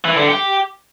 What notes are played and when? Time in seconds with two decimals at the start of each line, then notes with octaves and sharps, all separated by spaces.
0.05 E3
0.16 D3
0.28 G4